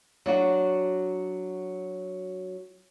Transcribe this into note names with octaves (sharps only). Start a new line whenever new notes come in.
F#3 D4 F#4